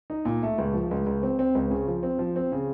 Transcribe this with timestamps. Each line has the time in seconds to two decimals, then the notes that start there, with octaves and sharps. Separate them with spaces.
0.10 D#4
0.25 A#2
0.43 A3
0.58 C#2
0.74 F3
0.91 C#2
1.06 C#2
1.23 C4
1.39 C4
1.55 C#2
1.71 C#3
1.88 F3
2.03 C4
2.19 F3
2.36 C4
2.52 C#3